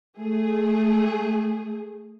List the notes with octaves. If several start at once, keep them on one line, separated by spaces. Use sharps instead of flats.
A3 G#4